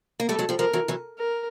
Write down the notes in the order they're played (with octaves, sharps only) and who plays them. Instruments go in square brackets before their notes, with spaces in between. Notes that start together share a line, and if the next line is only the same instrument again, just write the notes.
[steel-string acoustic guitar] A#3
[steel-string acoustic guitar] G3 A3 [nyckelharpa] A4
[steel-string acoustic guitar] F#3 G#3
F3 G3
[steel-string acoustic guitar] F3 G3 [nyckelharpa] A#4
[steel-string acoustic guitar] E3 F#3
E3 F#3
[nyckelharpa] A#4